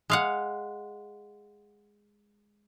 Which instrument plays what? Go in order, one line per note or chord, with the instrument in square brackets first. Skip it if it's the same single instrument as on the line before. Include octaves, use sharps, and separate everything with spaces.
[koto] G#3 F5 F#5